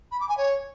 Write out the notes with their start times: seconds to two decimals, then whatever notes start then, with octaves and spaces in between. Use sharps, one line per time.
0.12 B5
0.20 D6
0.29 G#5
0.37 C#5